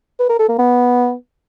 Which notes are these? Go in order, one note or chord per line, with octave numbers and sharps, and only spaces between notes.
B4
A#4
A4
A#3
B3